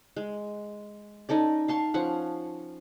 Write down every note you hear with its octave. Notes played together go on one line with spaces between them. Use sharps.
G#3
C#4 D#4 A4 D5
F5 A5 C6 C#6
F3 C#4 F#5